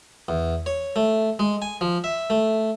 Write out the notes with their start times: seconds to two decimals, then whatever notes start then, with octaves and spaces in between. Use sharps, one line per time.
0.28 E2
0.66 C#5
0.96 A3
1.39 G#3
1.62 G#5
1.81 F3
2.04 E5
2.30 A3